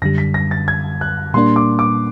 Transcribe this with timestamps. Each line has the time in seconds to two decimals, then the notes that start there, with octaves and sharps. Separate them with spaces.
0.02 F#2 D3 G3 A#6
0.18 B6
0.34 A#6
0.51 A6
0.68 G#6
1.01 F#6
1.34 A#2 G3 A#3 D4 C6
1.56 D6
1.79 D6